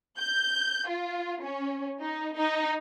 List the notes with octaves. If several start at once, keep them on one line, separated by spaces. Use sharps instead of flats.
G6
F4
C#4
D#4
D#4